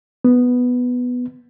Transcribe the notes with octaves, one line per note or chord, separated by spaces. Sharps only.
B3